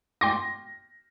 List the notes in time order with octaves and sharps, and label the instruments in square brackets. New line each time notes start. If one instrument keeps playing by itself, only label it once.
[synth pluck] G5 C6 D6 [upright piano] A#6